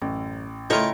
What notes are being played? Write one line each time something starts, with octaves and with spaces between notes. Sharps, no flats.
A1 F#2
C#3 A3 E4 F4 A#4 C#5 D#5 G5